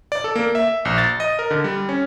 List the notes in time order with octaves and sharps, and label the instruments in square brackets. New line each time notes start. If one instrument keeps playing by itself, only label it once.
[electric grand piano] D5
A4
A#3
E5
A#1
A6
D#5
A#4
D3
G3
C#4